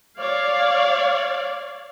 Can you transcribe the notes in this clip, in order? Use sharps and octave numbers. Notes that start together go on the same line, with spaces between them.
C#5 D5 F5